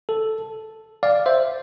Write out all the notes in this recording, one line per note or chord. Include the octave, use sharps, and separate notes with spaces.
A4
D5 F5
C5 E5